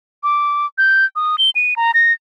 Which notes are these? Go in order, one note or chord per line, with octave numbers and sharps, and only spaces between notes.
D6
G6
D#6
G7
D#7
A#5
A#6